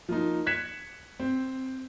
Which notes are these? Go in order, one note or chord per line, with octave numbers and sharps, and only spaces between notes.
F3 A#3 D#4
F#6 G#6 B6 C#7 E7
C4